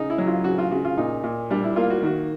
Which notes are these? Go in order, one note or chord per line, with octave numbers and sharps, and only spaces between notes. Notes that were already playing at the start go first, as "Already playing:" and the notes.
Already playing: C#3 D#4
E4
F#3
F4
C#3 F#4
F4
C#3 F#4
F4
A#2 D#4
A#2
G3 D4
E4
A#3 F4
F#4
D#3 F#4